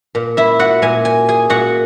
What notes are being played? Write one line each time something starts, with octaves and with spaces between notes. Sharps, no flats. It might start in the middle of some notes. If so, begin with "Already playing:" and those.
A#2
E4 E5
F#4 F#5
A#2 G#5
G#5
G#4 G#5
A#2 F#4 F#5